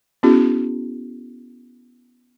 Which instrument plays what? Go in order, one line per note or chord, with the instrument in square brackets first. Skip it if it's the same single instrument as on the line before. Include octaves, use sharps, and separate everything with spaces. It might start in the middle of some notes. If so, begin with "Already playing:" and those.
[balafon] B3 C#4 E4 F#4 G#4